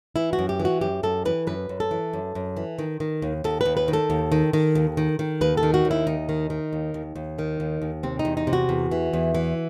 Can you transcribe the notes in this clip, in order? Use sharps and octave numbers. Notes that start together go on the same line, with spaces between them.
E3 E4
F#4
F#2
G4
E3
F#4
F#2 G4
F#2 A4
E3 B4
F#2 B4
F#2
A4
E3
F#2
F#2
E3
D#3
D#3
D#2
D#2 A4
D#2 B4
B4
D#3
A4
D#2
D#3
D#3
D#2
D#3
D#3
D#2 B4
A4
D#3
F#4
D#2
E4
D#2 D#4
D#3
D#3
D#2
D#2
D#2
D#3
D#2
D#2
C3 C4
D#4
E2
D#4
C3
F#4
E2
E3
E2
E3